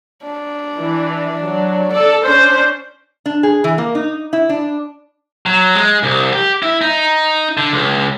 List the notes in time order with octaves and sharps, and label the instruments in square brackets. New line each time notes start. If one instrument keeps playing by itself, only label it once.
[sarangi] D4
[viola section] E3
F#3
[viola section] A4 [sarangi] D5
[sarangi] C#4 [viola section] D4 C5
[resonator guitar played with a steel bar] D4
G#4
E3
A#3
D#4
E4
D4
[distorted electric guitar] F#3
G#3
C2
G4
E4
D#4
D3
C#2